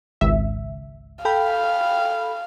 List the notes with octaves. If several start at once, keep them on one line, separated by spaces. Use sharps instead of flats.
G#1 C#2 E5
A4 F5 G5 B5